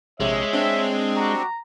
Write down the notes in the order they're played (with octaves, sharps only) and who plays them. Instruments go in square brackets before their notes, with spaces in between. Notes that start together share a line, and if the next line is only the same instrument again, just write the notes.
[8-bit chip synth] A#1 C3 [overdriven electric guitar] G#3 [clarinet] C#5 [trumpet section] E5
[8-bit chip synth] C4 D4
[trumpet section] F#4 G4 [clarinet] A#5